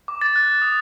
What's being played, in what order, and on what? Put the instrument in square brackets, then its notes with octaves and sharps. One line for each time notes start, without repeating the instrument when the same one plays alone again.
[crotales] D6
A6
F#6
D#6